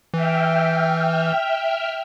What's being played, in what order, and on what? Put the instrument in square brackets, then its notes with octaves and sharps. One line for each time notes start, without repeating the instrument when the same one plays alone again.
[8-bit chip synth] E3 [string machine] E5 G5 F6